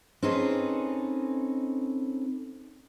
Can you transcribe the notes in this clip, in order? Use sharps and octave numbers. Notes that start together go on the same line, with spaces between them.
C4 C#4 D#4 G#4 A4 B4